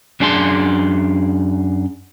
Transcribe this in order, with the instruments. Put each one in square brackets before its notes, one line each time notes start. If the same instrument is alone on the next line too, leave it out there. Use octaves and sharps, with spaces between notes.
[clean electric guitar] F#2 D4 G#4 A5 C6